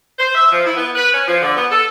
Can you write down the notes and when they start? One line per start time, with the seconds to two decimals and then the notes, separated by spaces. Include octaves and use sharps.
0.18 C5
0.35 E5
0.50 F3
0.65 E4
0.77 B3
0.96 B4
1.13 C#4
1.27 F3
1.42 D3
1.55 B3
1.70 A4